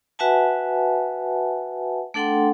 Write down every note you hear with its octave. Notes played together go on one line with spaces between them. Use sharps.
F#4 B4 E5 F#5 G#5 A5
A3 D4 A4 F#5 G5 C6